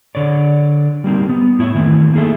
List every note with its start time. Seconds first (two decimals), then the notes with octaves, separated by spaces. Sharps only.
0.15 D3 C#5 D5
1.04 G3 A#3 C4 D#4
1.29 B3
1.59 A2 E4 C#5 E5
1.75 D#3 E3 A3 C4
2.13 A#3 D#4 G#4 A4 E5